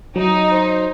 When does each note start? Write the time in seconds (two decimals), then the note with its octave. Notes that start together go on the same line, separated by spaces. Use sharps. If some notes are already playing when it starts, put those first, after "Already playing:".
0.16 F#3 D#4
0.52 C5